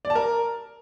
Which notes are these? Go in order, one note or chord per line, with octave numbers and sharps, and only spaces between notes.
D5
A5
A#4